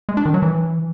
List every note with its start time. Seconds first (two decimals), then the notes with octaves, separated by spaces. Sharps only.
0.09 G#3
0.17 D4
0.26 D#3
0.34 F#3
0.42 E3